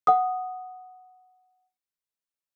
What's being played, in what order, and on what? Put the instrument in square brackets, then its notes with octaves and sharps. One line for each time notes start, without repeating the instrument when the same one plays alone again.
[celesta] F#5 D#6